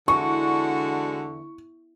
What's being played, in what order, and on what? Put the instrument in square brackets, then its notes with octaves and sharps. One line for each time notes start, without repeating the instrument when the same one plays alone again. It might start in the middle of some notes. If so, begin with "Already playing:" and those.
[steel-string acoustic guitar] E2 [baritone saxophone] D3 [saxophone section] G#3 D4 F#4 [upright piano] C#6